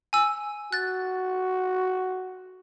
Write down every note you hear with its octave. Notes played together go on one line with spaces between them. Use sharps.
G#5 E6
F#4 F#6 A6